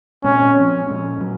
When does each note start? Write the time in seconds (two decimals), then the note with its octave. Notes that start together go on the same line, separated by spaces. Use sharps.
0.24 A#2 G#3 C4 C#4
0.56 F3 C4
0.87 A#2 G#3 C#4
1.19 A#2 F#3